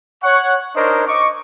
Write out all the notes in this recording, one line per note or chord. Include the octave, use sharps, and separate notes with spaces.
C#5 F#5 C#6
D4 D#4 A#4 C5 C#5 D#5
D#5 C#6 D6